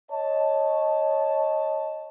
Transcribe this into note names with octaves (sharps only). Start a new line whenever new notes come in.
C#5 D#5 A5